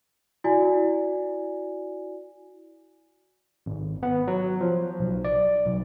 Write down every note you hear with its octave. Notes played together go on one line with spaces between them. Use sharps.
E4 F#4 D5 G#5
G#1
B3
F#3
F3
B1
D5
B1